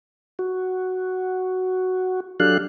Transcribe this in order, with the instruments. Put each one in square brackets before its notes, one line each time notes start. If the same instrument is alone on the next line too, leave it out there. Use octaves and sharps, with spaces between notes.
[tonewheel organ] F#4
F#3 D4 G4 A4 F5 F#6